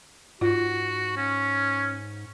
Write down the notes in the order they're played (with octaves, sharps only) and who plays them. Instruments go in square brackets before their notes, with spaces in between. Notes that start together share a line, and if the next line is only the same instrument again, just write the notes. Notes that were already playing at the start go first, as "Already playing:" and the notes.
[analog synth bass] G#2 [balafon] F4 [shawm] F#4
[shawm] C#4